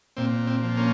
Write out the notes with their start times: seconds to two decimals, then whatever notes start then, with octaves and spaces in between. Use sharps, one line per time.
0.17 A#2 C4
0.47 C4
0.63 F3
0.77 A#3 C#4